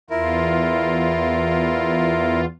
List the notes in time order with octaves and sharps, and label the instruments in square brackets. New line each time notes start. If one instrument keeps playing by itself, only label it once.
[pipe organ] E2 F4 [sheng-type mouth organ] E4 A#4